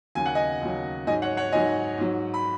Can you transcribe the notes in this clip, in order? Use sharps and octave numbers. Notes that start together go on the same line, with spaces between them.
D#2 C#3 F#3 G#5
F#5
D#5 G#5
D#2 C#3 F#3
G#2 F#3 D#5 G#5
C#5 F#5
C#5 F#5
G#2 F#3 D#5 G#5
G#2 F#3
B5